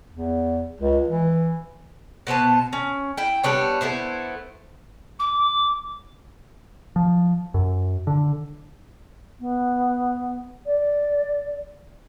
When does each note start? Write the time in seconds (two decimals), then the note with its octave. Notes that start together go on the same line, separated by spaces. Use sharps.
0.13 E2
0.81 C#2
1.08 E3
2.27 B2 B3 C5 A5
2.73 C#4
3.17 E4 G5
3.44 G3 B3 D4 C#5
3.81 A3 B3 E4 C5
5.19 D6
6.96 F3
7.54 F#2
8.07 D3
9.40 B3
10.66 D5